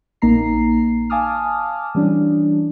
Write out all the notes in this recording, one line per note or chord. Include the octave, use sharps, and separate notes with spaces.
A#1 A#3 D#4 A#5 C7
F5 G#5 A5 D6 D#6 F6
E3 G3 C#4 D4